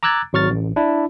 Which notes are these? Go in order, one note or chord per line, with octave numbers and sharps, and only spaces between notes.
A#5 D6 E6 F#6 G#6 A6
G#1 F#3 C#6 F6 A6
A1
D4 E4